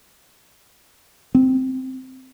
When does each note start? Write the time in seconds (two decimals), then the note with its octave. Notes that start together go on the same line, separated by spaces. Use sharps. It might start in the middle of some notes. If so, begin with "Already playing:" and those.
1.35 C4